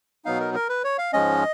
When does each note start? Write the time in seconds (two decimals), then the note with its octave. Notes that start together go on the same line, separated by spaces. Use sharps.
0.25 B2 F#3 B3 D#4 F5
0.40 A#4
0.54 A#4
0.69 B4
0.84 C#5
0.98 F5
1.13 G#2 F3 G#3 C#4 D#5